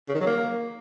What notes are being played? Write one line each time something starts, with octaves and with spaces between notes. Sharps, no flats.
C#3
D#3
F#3
A#3